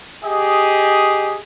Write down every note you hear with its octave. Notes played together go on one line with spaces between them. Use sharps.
G4 G#4 D#5